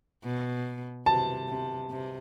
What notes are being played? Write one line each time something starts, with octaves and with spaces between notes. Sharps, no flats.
B2
C3 A5
C3
C3